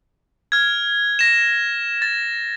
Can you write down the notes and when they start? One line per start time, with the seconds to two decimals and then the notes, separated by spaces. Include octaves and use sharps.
0.52 F6 G#6
1.19 A#6 E7
2.02 A6